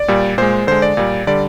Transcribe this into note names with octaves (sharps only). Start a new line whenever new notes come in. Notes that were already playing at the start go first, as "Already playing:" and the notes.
Already playing: D5
A#2 G3
A#2 G#3 C5
D3 G#3 C5
D5
A#2 G3
D3 G3 D5